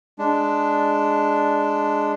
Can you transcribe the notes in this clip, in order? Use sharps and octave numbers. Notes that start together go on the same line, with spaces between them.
G#3 D4